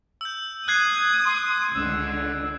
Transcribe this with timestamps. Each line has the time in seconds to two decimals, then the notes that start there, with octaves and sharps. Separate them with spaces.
0.21 E6 G6
0.68 D#6 F#6 G#6 C7
1.25 C6
1.74 C#2 D3 E6